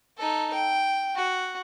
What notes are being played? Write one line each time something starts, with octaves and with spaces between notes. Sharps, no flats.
D#4 A4
G5
F#4